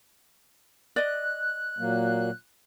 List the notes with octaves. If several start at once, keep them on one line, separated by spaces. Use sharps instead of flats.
D5 D#5 F#6
A#2 F#3 A#3